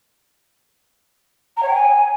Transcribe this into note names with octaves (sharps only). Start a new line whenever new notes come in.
A#5
C#5
G5
G#5